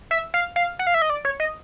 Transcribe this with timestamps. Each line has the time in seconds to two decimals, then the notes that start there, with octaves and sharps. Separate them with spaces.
0.11 E5
0.34 F5
0.56 F5
0.79 F#5
0.87 F5
0.94 E5
1.02 D#5
1.10 D5
1.25 C#5
1.40 D#5